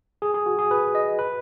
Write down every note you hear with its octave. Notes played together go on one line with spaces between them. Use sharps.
G#4
G#4
F#4
G#4
B4
D#5
B4